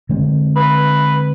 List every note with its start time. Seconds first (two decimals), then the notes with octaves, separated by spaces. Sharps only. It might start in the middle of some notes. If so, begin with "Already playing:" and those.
0.09 D3 G#3 C4
0.56 B4